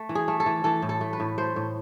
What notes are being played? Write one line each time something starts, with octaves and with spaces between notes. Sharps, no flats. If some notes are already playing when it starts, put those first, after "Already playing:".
Already playing: A3
E3
G#4
A3
A4
E3
E3 A4
A2
A4
A3
B4
A2
A3 C5
A2